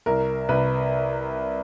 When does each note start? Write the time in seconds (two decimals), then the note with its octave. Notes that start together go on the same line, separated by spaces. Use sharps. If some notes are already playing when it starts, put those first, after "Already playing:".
0.06 C2 A#4
0.49 C2 B4